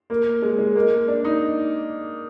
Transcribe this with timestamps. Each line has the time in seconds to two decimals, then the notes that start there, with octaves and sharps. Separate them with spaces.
0.10 A#3
0.42 G#3
0.59 G#3
0.76 A#3
1.08 D4
1.25 D#4